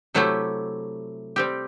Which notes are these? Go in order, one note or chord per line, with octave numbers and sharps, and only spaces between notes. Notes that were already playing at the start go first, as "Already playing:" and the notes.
C3 F#3 A3 E4 G4
G3 C4 G4